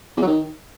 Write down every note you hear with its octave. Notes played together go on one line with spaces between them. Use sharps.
E2
F#3
D#3